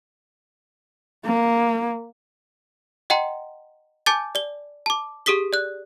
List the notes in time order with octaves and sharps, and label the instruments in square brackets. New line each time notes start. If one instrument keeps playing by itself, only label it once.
[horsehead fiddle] A#3
[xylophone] D#5 F#5 G5 A#5 C6
G#5 A5 D6 G6 A6
D5 G7
A5 D6
G4 G#4 D#6 B6 G7
D5 F#6